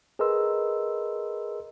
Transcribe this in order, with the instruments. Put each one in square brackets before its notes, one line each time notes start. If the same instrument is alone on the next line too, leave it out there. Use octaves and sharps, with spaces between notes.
[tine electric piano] G#4 A#4 B4 D#5 C6 E6